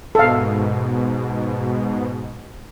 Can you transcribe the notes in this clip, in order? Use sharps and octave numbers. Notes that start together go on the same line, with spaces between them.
G#2 B2 A4 F5